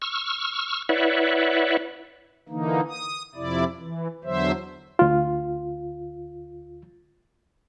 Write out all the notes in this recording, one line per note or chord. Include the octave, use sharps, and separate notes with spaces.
C#6 E6 F6
E4 B4 C#5 D5 E5 F#5
D3 E3 A#3 D#4
D#6
F2 C3 E4 D5
E3
E2 D3 F#3 C5 E5
D2 F4